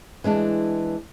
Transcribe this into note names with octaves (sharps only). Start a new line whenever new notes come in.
E3 G#3 D4